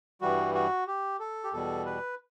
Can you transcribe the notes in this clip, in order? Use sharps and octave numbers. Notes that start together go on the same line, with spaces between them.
G2 E3 G3 F#4
F#4
G4
A4
G4
E2 B2 G3 A4
B4